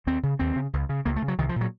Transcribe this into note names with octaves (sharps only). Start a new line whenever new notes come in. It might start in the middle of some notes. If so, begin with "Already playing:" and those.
D#2 C4
C#3
D#2 C4
C#3
C#2
C#3
C#2 A#3
A3
C#3
F#3
C2 D#3
F3
A#2
F#3